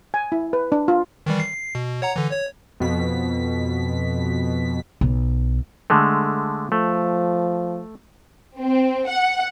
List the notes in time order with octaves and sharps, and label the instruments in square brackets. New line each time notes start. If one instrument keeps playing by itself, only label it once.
[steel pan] G#5
E4
B4
D4
F4
[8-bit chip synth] D#3 E3 G3
C7
B2
C#5 F#5 A#5
D3 E3
C#5
[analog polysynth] F2 B2 B6
[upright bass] B1
[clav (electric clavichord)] D3 G#3 A3
[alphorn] F3 [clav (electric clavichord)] A3
[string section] C4
F#5